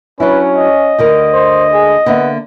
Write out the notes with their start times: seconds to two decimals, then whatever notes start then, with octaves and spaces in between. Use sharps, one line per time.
0.20 F#3 C#4 D4 E4 B4
0.56 D#5
0.98 D2 D3 A#4
1.33 C5
1.73 G#4
2.06 D3 A#3 B3 E5